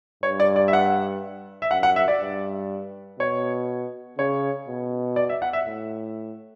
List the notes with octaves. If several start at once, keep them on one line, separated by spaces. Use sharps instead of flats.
G2 C#5
D5
D5
E5
F#5
E5
F#2 F#5
F#5
E5
D5
G2
B2 C#5
C#3 C#5
B2
D5
E5
F#5
E5
A2